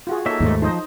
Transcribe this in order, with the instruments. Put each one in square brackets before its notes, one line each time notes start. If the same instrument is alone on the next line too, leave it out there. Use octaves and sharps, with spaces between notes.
[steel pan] F4 F#4 G#4
[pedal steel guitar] A#3 D#4 E5 [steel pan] A4 C#5
[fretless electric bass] D#2 G#2 A3
[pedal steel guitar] F3 [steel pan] D#4 C5 D#5